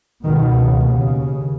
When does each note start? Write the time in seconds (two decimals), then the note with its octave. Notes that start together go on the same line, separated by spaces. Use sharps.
0.24 C#2 B2 D#3
0.54 C#3
0.82 D#2 C#3